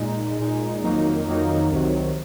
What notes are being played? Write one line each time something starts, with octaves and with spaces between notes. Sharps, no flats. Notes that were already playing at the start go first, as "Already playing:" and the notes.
Already playing: A#2 G#3 D#4
A#2 G#3 D#4
F2 D#3 F#3 A#3 D#4
F2 D#3 F#3 A#3 D#4
C2 C3 D#3 F#3